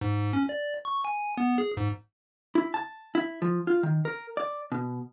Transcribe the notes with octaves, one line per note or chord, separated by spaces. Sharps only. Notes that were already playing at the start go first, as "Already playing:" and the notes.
G#2
C#4
D5
C#6
G#5
B3
G#4
G#2
E4
A5
E4
F3
F4
D#3
A#4
D5
B2